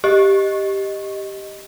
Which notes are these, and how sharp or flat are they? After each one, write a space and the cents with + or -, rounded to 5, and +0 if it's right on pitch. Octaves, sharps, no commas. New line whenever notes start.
G4 +0 D#5 +0